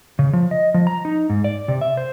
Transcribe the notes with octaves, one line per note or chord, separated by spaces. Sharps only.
C#3
F3
D#5
F3
A#5
D#4
G#2
D5
C3
E5
C5